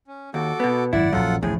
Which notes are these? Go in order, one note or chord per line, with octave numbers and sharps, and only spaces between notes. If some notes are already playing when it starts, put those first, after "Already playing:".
C#4
D#2 F#4 A4 D6
B2 B3
G#1 F#2 F#3 E4 D5 F#5
A#1 F#2 F3 F4 A4 F#5
A1 D2 A2 F3 G#4